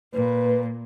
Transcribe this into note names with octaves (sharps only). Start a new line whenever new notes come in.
A#2 B4